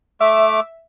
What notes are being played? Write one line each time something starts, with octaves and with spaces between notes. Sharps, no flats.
A3 E5 D6